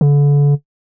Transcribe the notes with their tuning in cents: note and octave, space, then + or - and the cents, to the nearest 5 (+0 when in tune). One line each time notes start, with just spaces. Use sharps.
D3 -35